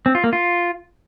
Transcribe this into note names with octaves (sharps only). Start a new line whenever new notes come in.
C4
F4
A#3
F4